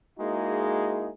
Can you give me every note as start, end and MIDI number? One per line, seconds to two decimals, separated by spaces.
0.19 1.09 56
0.19 1.09 58
0.19 1.09 63
0.19 1.09 64
0.19 1.09 66
0.19 1.09 68